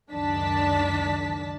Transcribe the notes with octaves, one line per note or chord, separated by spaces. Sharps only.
C#2 F#2 D#3 D4 A5 B6